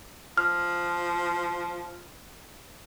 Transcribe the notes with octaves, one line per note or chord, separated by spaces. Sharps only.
F3 F6